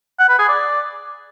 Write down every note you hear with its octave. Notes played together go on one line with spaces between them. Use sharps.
F#5
B4
G#4
D5